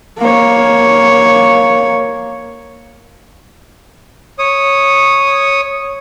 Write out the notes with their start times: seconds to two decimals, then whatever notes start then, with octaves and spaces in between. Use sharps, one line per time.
0.18 A#3 C#5
4.39 C#5 D#6